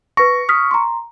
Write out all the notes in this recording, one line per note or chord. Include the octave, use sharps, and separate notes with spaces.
B4 C#6 A#6
D#6 F6 B6
A#5 C6